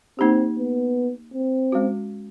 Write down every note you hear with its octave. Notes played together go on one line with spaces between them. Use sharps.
A#3 C4 D#4 G4
B3
C4
G#3 C#4 F#4